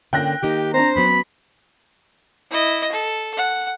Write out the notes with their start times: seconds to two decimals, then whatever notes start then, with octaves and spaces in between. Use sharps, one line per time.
0.13 D3 A#3 C#4 G5 F#6 A#6
0.42 D#3 A#3 D#4 G4
0.74 C4 D4 C5 A#5
0.96 F#3 B3 C#4 B5
2.51 E4 D#5
2.91 A4
3.37 F#5